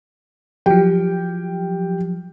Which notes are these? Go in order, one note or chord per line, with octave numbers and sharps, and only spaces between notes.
F3 F#3 G4 G5